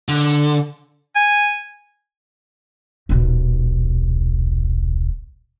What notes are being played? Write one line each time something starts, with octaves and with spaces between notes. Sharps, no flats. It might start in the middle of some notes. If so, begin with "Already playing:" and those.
D3
G#5
D#1 B1